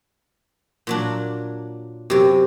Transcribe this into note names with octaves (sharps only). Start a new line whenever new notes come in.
A#2 F#3 D4
F#2 C3 G4